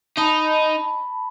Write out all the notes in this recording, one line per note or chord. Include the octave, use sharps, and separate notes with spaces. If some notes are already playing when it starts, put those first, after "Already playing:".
D#4 A5 B5